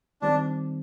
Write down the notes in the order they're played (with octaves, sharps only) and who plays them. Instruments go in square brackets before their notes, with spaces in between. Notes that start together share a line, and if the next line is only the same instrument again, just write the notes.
[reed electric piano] D#3 G3 C4 [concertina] D4